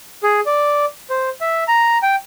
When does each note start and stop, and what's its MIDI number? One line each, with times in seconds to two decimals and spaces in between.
0.23 0.40 68
0.46 0.85 74
1.10 1.29 72
1.41 1.64 76
1.68 1.98 82
2.03 2.16 79